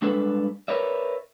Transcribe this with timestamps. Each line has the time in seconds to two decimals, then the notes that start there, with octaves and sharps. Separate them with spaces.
0.02 G3 G#3 D4 A4 B4
0.68 A#4 B4 C#5 D5 E5